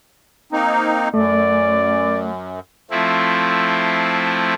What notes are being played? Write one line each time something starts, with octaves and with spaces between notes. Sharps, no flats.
A#3 C4 D#4
F#2 A3 D5
F3 A3 C4 E4